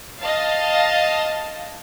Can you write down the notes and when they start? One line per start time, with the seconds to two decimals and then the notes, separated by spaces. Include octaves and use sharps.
0.20 D#5 F5 A5